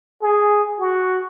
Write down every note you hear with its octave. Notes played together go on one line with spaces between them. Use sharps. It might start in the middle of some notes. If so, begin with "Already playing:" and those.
G#4
F#4